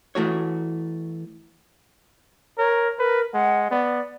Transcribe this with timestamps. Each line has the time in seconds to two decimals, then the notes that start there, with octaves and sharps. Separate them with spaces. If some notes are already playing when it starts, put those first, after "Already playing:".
0.15 E3 A3 F#4 C#5
2.58 A#4 C#5
2.99 A#4 B4
3.34 G#3 F#5
3.71 B3 D5